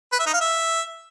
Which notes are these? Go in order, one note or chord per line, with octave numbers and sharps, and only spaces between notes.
B4
E5
D#4
F5
E5